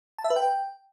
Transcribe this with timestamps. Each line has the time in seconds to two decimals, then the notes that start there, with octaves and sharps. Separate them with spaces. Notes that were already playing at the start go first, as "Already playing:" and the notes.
0.18 A5
0.24 E5
0.30 B4
0.36 G5